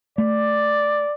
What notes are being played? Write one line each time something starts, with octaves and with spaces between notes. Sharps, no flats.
A3 D5